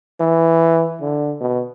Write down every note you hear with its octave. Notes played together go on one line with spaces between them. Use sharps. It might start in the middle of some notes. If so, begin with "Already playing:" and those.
E3
D3
B2